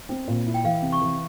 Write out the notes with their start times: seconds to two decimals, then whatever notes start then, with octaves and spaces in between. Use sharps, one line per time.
0.09 C4
0.28 A#2
0.46 E4
0.54 G5
0.64 E3 F5
0.82 C3
0.92 C#6
1.02 E3